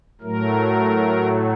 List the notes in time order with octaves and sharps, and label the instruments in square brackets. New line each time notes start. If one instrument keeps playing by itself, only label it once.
[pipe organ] A2 F#3 A3 A#4